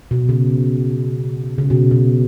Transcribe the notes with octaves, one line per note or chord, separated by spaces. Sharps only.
B2
C#3
C#3
B2
B2